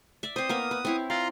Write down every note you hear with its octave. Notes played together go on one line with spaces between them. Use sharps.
D5 E5
C4 C5 D#6
A#3 B3 A#4
B4
C4 E4 C#5
F4 D5 A#5 C6